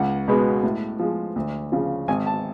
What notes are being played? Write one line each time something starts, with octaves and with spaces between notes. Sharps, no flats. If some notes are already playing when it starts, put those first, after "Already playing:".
Already playing: C#2 F#5
B2 G#3 B3
A2
F3 G#3
D2
C#3 F3
G#1 G#5
A5